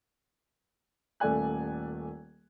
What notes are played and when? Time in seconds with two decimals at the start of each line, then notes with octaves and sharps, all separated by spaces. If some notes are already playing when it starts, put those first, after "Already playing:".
1.20 D#1 A3 A4 D5 G#5 F#6